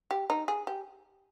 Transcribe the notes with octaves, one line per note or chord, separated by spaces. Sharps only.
G4
D#4
G#4
G4